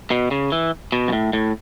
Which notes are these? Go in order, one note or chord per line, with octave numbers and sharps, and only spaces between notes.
B2
C#3
E3
B2
F#2
A2
A2